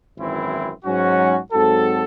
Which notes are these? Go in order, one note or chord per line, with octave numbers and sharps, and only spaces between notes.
G#1 F#2 E3 C4 E4
G#2 F#3 C#4 F#4
G#2 F#3 C4 F#4 A4